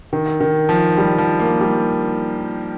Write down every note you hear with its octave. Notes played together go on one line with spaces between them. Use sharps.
D#3
D#3
F3
G3
F3
A#3
G3